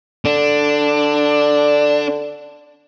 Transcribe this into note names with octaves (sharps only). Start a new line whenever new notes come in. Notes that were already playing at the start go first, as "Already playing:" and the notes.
D3 D4